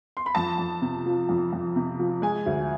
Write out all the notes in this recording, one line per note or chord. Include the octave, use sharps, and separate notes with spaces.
C6
B5
F2 A5
F2
C3
F3
F2
F2
C3
F3
G#3 G#5
D2